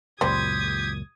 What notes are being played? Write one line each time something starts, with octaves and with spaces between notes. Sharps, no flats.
C#2 F#2 A#2 G3 G4 C5 D#6 G#6